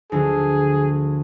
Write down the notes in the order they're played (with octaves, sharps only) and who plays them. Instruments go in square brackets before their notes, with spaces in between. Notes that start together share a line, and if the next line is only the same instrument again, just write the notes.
[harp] D2 D3 F3 [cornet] G#4